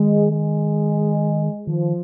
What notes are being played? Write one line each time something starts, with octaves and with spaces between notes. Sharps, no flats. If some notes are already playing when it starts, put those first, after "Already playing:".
Already playing: D#3 G#3
G#3
D#3 F3